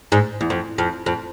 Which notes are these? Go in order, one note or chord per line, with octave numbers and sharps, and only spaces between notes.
G#2
E2
F2
F2
F2